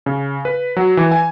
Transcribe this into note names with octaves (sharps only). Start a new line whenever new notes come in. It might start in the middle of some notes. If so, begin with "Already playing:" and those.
C#3
B4
F#3
E3
G#5